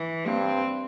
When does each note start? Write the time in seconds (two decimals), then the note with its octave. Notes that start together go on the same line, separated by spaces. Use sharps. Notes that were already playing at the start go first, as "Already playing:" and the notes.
Already playing: E3
0.26 G2 C4